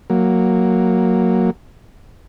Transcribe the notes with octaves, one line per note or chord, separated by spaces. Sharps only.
F#3 A#3